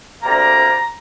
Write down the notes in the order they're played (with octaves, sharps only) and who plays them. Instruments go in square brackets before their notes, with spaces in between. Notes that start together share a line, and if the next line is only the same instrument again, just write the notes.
[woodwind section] D2 C3 G3 A#3 A#5